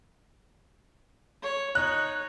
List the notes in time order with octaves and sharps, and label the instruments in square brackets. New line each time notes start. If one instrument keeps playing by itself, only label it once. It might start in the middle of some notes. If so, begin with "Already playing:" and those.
[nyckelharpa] C#5
[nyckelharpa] D#4 C#5 [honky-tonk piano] F#6